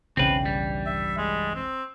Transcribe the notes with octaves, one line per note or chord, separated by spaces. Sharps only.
E1 B1 G2 C#3 E3 C4 B4 G5
G3
E5
G#3
C4